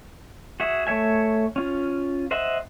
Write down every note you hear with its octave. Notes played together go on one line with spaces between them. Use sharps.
F#4 G#4 E5
A3 C#5 E5 G#5
C#4 F4
C5 D#5 E5 F#5